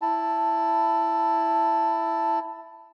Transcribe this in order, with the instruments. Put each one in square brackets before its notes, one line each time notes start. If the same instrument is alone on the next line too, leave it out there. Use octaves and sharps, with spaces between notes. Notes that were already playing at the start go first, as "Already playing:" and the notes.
[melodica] E4 A5